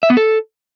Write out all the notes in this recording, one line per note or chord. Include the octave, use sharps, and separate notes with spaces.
E5
B3
A4